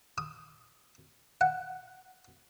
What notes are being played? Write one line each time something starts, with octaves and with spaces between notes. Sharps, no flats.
D#6
F#5